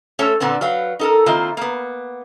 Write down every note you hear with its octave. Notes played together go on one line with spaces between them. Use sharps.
A3 C#4 A4 C5 C#5
A#2 D3 B3 C4
F#3 B4 F5
D#4 A4 A#4
D#3 A#3 C4 E4 F4
A#3 B3